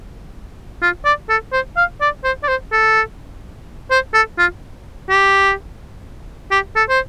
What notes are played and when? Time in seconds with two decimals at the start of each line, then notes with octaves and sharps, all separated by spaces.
0.82 F4
1.05 D5
1.29 A4
1.53 C5
1.77 F5
2.01 D5
2.24 C5
2.43 D5
2.48 C5
2.72 A4
3.91 C5
4.14 A4
4.38 F4
5.10 G4
6.51 G4
6.76 A4
6.90 C5